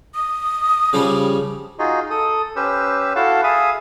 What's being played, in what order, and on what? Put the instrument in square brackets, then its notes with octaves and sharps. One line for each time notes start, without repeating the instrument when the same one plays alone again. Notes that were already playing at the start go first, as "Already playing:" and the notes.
[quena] D#6
[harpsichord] C#3 F3 G3
[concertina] D#4 F4 F#4 G#4 D#5
A4 D#6
C#4 G4 B4 C5 E6
E4 F#4 A4 F5 F#5 A5
G#4 E5 F5 G#5 B5 D#6